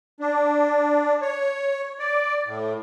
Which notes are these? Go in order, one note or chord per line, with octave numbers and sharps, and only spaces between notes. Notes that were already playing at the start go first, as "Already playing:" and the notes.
D4
C#5
D5
A2